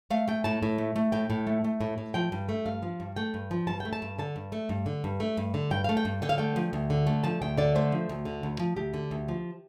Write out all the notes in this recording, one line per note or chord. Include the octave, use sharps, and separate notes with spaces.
A3 F5
A3 G5
A2 A5
A2
A3
A3
A2 G5
A2
A3
A3
A2
A2
F3 G5
G2
A3
G2 F5
F3
G2
A3 G5
G2
F3
G2 A5
A3 G5
A5
G2
D3 A5
G2
A3
G2
D3
G2
A3
G2
D3
G2 G5
A3 F5
G5
G2
D3 G5
F5
A3 G5
F3
D2
D3
A3
F3 A5
D2 G5
D3 D5
A3 C5
F3
D2
D3
D2
F3
D2 G4
D3
D2
F3